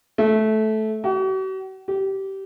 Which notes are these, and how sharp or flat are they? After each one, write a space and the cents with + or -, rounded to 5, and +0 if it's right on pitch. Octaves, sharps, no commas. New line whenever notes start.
A3 -15
F#4 +45
G4 -20